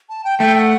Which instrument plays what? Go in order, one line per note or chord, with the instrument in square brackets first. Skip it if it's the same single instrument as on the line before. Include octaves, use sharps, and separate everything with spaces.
[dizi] A5
G5
[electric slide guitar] A3 [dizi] G5
[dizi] G5
F#5